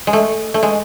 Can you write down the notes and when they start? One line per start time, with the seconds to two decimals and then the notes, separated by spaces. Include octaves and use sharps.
0.07 G#3
0.13 A3
0.54 A3
0.63 G#3